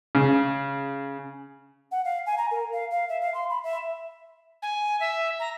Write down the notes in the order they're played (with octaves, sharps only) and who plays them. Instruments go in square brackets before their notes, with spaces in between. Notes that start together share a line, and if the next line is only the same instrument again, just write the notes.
[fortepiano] C#3
[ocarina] F#5
F5
G#5
A#5
A#4
F5
F5
E5
F5
C6
B5
E5
[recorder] G#5
E5
A#5